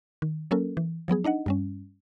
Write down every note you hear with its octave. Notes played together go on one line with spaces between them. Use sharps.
D#3
F#3 A#3 C#4 A4 A#4
E3
F3 F#3 B3 G#4
D4 D#4 D#5 F#5
G2 G3 C#4